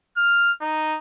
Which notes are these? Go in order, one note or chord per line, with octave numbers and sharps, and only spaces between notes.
F6
D#4